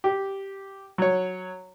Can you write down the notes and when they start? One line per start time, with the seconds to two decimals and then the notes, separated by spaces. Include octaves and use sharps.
0.04 G4
0.98 F#3 C#5